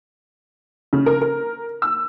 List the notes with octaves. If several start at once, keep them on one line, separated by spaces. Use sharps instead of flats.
C#3
A#4
A#4
E6